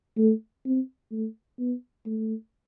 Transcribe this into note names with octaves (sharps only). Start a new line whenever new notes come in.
A3
C4
A3
B3
A3